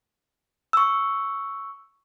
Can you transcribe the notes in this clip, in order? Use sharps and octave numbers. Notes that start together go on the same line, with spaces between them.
C#6 E6